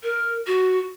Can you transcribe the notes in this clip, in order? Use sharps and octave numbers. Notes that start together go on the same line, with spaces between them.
A#4
F#4